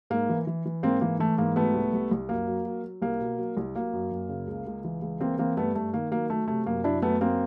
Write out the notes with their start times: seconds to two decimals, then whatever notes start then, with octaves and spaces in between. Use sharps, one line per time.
0.10 G#2 A#3
0.29 E3
0.47 E3
0.66 E3
0.83 G#2 A#3 C4
1.01 E3 A#3
1.19 E3 A3
1.38 G#2 A#3
1.56 F#3 A3 B3
1.74 C2
1.93 C2
2.11 C2
2.29 F#2 A#3
2.47 F#3
2.65 F#3
2.84 F#3
3.02 C2 A#3
3.21 B2
3.38 F#3
3.57 C2
3.75 F#3 A#3
3.93 F#2
4.11 F#2
4.29 C#3
4.47 C#2
4.67 C#2
4.84 E3
5.02 C#2
5.21 E3 A#3 C4
5.38 E3 A#3 C4
5.57 G2 A3 B3
5.75 G2 A3
5.93 D#3 A#3
6.12 F#3 A#3
6.30 F#3 A3
6.48 C3 A3
6.66 F#2 A#3
6.84 F#2 D4 E4
7.02 F#2 A3 B3
7.20 F#2 A#3 C4